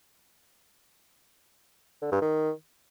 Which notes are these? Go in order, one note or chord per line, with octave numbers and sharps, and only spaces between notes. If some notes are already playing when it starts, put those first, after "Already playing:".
D3
G2
D#3